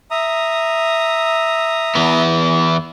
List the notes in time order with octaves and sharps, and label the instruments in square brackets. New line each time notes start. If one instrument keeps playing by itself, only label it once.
[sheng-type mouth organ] E5 A#5 D#6
[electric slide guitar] E2 E3 B3